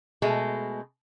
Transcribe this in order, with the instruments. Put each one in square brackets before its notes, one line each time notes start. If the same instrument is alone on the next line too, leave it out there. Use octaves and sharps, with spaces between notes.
[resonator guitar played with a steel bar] B2 G#3 A3